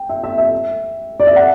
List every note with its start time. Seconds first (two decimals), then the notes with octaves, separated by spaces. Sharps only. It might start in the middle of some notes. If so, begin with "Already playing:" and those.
Already playing: G5
0.09 E5
0.24 E5
0.38 E5
1.20 D5
1.27 E5
1.36 F#5